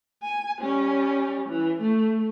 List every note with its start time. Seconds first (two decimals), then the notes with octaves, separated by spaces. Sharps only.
0.23 G#5
0.60 G3 C#4
1.49 E3
1.81 A3